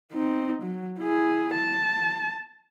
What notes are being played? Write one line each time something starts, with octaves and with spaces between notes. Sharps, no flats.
C4 D#4
F#3
E4 G#4
A5